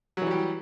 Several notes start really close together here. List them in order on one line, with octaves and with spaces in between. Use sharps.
F#3 E3 G3 G4